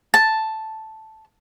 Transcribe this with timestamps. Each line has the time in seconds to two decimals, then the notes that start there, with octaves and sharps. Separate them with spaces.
0.14 A5